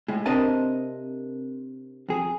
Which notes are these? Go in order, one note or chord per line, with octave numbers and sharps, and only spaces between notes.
A2 G#3
C3 C4 D4 A#4 D#5 A5
F2 G#4